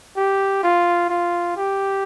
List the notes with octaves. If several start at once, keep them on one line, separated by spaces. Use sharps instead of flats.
G4
F4
F4
G4